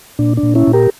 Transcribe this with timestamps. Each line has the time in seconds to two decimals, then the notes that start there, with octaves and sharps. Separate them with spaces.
0.19 A#2 D4
0.37 D4
0.43 A#2
0.55 C#4 E4
0.67 A#2
0.73 G4 A#4